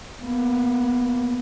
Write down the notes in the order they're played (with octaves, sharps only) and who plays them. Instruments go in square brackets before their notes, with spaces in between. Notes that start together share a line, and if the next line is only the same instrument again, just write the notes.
[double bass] A#3 B3